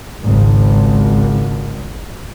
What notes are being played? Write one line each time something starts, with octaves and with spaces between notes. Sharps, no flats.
G#1 C#2